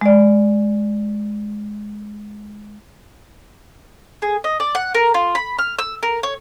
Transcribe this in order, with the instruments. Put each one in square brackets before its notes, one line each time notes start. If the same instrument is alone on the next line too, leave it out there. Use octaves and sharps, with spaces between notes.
[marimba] G#3 D5
[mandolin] G#4
D#5
D5
F#5
A#4
F4
B5
F6
E6
A#4
C#5